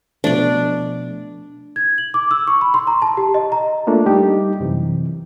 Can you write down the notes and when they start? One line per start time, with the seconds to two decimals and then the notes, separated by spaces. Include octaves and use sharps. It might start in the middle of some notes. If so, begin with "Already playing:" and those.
0.24 B2 F3 A3 D4 D5
1.76 G#6
1.98 F#7
2.14 D6
2.31 E6
2.47 C#6
2.61 B5
2.74 C6
2.87 A#5
3.02 A5
3.17 G4
3.34 D#5
3.52 A#5
3.87 A3 A#3 D4 F4
4.06 G3 D#4 G4
4.60 F#2 C3 E3